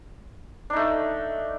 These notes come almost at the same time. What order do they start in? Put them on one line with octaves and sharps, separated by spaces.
D4 D#4 A3